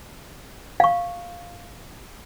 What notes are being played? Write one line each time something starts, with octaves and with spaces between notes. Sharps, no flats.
F5 C#6